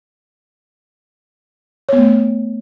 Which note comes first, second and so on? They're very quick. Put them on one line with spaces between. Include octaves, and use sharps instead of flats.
C#5 B3 A3